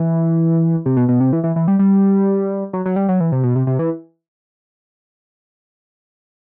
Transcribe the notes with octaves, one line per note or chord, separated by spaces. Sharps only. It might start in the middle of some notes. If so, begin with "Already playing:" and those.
Already playing: E3
C3
B2
B2
C3
E3
E3
E3
G3
G3
F#3
F#3
G3
F#3
E3
C3
B2
C3
C3
E3